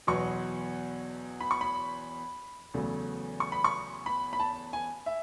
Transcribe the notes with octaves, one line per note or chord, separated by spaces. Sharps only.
E2 B2 F#3 B3 C#6
B5
C#6
B5
E2 C#3 F#3 A3
C#6
B5
C#6
B5
B5
A5
G#5
E5